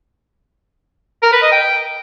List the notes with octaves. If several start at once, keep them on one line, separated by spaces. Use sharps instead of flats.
A#4
B4
D#5
G5